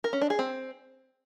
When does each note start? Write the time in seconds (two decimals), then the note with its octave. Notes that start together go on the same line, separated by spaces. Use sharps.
0.04 A#4
0.13 C#4
0.21 D4
0.30 G#4
0.39 C4